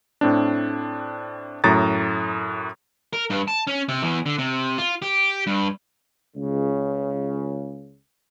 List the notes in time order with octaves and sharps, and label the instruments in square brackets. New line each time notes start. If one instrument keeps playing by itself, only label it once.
[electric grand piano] A2 C4 D4
F#2 A2 A#5 A6
[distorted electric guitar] A#4
G2
A5
C#4
C3
E2
D3
C3
F4
G4
G2
[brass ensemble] C#2 C#3